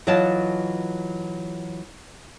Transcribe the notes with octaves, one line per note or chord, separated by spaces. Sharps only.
E3 F#3 F4 C#5 D#5 A5